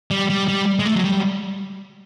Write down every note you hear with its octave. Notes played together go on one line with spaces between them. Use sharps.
G3
G3
G3
G#3
A3
F#3
G3